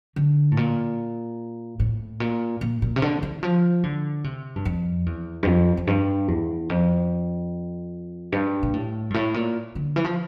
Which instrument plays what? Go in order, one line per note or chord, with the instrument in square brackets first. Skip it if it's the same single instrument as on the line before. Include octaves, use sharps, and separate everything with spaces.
[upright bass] D3
A2
A#2
A2
A#2
A#2
A#2
C3
D3
E3
F3
D3
C3
G2
F2
E2
G2
F2
F2
G2
E2
F2
G2
A#2
A2
G2
A2
A#2
D3
E3
F3